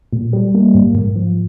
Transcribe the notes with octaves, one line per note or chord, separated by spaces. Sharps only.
A#2
G3
A#3
G#2
G#2
F3